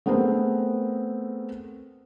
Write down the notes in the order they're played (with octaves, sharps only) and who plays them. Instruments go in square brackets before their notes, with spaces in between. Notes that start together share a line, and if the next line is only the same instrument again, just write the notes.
[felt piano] A3 B3 C4 G#4 A#4